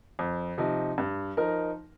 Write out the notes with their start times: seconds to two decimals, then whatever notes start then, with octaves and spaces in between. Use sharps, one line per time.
0.19 F2
0.58 C3 F3 D#4
0.98 G2
1.37 F3 D#4 A#4